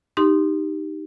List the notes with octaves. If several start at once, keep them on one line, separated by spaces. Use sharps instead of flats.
D#4 G4 C6